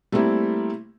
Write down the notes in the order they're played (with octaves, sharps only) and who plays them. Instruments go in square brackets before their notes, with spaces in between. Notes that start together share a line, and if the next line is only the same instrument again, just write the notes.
[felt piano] G3 A3 A#3 C4 E4